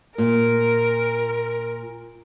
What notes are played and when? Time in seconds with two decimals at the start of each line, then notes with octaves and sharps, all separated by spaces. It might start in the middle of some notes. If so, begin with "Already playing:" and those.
0.18 A#2 A#4